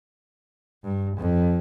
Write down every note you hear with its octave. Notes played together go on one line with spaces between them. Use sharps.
G2
F2